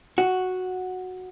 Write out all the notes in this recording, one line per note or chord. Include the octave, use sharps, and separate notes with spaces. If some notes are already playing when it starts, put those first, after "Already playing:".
F#4